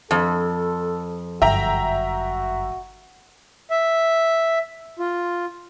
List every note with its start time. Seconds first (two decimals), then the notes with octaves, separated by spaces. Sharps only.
0.11 F2 A4
1.42 G1 F#2 F#4 E5 G5 A#5
3.71 E5
4.99 F4